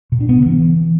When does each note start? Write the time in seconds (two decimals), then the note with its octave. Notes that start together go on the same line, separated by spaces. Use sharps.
0.12 B2
0.20 D4
0.29 B3
0.37 C#3
0.46 E3